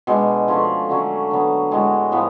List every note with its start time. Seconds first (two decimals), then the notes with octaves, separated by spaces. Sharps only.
0.07 B2 G#3 D4
0.48 F3 A3 C#4 F4
0.89 D3 F#3 A3 C#4
1.30 D3 F#3 B3
1.71 A2 G#3 B3 F#4
2.12 A2 F3 B3